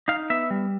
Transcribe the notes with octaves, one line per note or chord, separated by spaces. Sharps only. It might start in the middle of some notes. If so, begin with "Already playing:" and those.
D#4 F5
B3 E5
G3